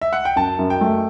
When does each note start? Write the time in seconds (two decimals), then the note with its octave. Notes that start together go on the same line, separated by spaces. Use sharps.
0.01 E5
0.13 F#5
0.25 G5
0.36 F#2 A5
0.59 F#2
0.70 G5
0.81 A3